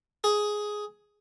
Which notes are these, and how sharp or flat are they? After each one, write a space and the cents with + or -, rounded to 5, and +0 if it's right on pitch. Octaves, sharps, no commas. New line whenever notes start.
G#4 +5